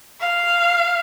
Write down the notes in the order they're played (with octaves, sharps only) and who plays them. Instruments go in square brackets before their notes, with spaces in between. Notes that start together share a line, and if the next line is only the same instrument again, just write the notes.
[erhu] F5